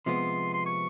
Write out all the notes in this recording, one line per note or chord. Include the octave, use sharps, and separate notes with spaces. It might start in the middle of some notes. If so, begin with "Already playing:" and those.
C3 F3 G#3 B3 C6
C6
C#6